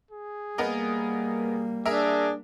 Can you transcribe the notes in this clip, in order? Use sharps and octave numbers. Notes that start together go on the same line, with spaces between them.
G#4
G3 A#3 B3 A#4 D#5
D4 G#4 A#4 E5